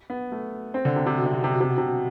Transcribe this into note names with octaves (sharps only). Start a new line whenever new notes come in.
B3
A3
C4
D3
C3
C3
B2
C3
B2
C3
B2
C3
B2
C3
B2